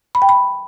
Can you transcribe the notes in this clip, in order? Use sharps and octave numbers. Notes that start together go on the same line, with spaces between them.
B5
G5
B5